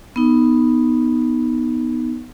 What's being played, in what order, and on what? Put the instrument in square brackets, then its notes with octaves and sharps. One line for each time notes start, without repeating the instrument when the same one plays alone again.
[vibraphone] B3 D#4